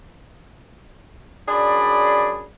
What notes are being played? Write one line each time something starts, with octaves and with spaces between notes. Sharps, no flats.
F#2 D4 G#4 D5 B5